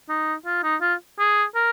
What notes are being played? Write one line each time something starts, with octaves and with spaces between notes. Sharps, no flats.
D#4
F4
D#4
F4
G#4
A#4